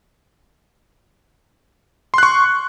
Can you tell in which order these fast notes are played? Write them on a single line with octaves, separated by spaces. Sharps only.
C6 F#6 C#6